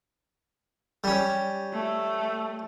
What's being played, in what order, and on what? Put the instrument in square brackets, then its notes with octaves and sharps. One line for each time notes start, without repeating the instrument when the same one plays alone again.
[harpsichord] G3 C#4
[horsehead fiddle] A3